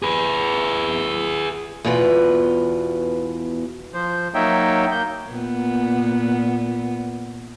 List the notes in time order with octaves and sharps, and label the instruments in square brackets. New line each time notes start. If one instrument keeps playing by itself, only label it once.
[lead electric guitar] G#4 B4
[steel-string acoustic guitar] E2 B2 F4 B4
[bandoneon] F3 C5
F#3 A#3 D#4 C#5 E5 G5
A#3 G6
[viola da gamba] A#2 B3